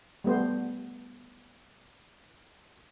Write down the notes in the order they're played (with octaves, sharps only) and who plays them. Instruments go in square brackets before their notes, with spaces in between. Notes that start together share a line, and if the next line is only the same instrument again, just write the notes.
[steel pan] G3 A3 B3 C5